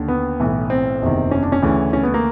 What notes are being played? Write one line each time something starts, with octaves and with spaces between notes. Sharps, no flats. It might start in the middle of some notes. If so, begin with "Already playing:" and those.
Already playing: D#2 D3
B3
B1 A2 E3
C4
F#1 E2 C3 D#3
C#4
D4
C#4
D2 C#3 E3
C#4
B3
A#3